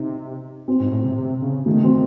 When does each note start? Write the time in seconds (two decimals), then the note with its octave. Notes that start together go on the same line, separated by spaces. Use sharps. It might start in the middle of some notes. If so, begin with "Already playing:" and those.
Already playing: C3 D#4
0.68 C4
0.80 G#2
0.92 A2
1.05 C3
1.17 C3
1.42 C#3
1.66 D#3 A3
1.83 C4
1.91 D#3